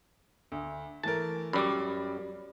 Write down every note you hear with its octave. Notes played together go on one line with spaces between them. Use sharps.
D2
E3 A3 A#4 A5
F#2 G3 B5 D6